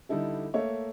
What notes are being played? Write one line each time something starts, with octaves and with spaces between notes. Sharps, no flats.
D3 G3 D#4 E4 A4
A3 A#3 C#5 E5